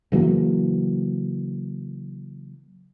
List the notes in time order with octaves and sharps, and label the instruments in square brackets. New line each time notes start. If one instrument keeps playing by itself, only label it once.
[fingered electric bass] C#3 E3 F#3 A#3